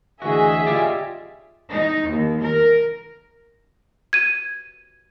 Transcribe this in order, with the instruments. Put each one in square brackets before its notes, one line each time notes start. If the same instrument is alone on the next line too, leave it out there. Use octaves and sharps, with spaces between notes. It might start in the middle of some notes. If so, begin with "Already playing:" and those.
[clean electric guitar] D2 E3 F#4 [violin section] G#4 D#5 E5
[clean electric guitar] F4 G4 D5
[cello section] D#4
D#2
A#4
[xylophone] G#6 D#7